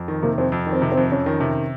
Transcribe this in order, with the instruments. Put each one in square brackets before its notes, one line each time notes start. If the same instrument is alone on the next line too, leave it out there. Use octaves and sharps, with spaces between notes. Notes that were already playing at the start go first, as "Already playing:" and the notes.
Already playing: [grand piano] F2
D#3
[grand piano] C3 [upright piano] A#3
[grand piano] F2 [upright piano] C4
[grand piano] F2
D#3
[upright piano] C4
[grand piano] C3
[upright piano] C4
[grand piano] F2
[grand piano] F2 [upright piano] C#4
[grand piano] D#3
C3